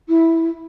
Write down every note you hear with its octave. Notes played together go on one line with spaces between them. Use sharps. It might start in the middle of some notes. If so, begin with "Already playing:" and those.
E4